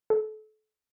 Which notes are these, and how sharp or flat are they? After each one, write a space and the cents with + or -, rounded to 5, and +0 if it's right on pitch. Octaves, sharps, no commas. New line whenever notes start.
A4 -30